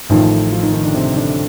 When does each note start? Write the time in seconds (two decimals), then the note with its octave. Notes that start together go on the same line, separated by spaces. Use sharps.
0.09 A1 A2 D#3 F3 D#4
0.52 F3 F4
0.63 D#3 D#4
0.73 D#3 D#4
0.83 D3 D4
0.94 C3 C4
1.16 D3 D4